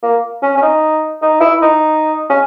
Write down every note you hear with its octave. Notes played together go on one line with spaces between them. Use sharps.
A#3
C#4
C#4
D#4
D#4
E4
D#4
C#4